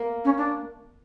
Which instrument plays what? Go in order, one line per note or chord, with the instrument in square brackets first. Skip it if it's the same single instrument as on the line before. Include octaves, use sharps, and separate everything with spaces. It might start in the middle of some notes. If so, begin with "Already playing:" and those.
Already playing: [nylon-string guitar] A#3
[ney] C#4
D4